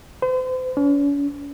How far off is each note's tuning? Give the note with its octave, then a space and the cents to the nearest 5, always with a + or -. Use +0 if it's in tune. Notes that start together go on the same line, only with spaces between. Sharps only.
C5 -40
C#4 +40